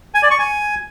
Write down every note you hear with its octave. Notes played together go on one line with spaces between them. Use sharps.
G#5
D5
C#6
G#5